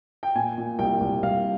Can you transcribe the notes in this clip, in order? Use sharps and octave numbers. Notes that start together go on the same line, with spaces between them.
G5
A#2 G#5
A#2
C2 G5
C2
C2 F5